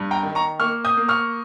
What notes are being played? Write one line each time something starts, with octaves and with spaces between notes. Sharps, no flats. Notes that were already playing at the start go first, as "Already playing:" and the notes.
Already playing: G2
G5 A#5
D#3
A#5 C#6
A#3 C#6 F6
D#6 G6
A#3
C#6 F6